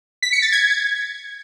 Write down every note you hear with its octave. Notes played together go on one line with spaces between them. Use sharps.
B6
C#7
A6
G#6